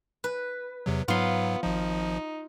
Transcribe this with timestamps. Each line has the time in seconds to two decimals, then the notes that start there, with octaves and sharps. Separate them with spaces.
0.24 B4
0.86 E2 C3 F#3
1.08 G#2 F#3 B3 F4 C6
1.63 G#1 F3 D#4